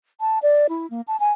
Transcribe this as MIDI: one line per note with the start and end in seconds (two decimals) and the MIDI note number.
0.21 0.39 81
0.42 0.67 74
0.69 0.89 64
0.90 1.01 58
1.08 1.17 81
1.20 1.33 80